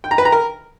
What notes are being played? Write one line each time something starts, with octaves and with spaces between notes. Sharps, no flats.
G5
A#5
B4
A#5
A#4